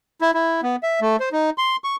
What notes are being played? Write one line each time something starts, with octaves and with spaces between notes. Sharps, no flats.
E4
E4
B3
E5
A3
C5
D#4
C6
C#6